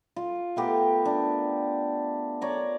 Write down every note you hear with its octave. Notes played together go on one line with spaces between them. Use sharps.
F4
A3 B3 G4 A#4
D4
C#5 D5 A#5